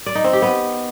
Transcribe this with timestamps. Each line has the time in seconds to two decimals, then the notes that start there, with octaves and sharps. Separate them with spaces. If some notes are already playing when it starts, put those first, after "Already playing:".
0.06 D5
0.15 D#4
0.24 C4
0.33 G4
0.42 B3